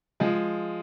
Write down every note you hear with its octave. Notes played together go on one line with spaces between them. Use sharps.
F3 G#3